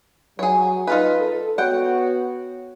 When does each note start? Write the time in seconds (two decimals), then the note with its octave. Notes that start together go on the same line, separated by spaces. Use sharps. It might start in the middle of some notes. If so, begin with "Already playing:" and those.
0.39 F#3 G#4 C#5
0.87 D#4 F4 B4
1.20 A4
1.58 B3 F#4 C#5 F#5 G5